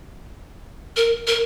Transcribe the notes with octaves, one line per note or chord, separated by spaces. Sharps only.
A#4
A#4